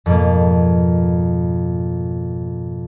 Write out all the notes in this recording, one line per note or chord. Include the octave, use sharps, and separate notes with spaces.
F2 G#2 B2 A#3